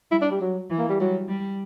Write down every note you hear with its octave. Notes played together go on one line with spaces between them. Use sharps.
G3 E4
D4
G3
F#3
E3
A#3
G3
F#3 G3
G3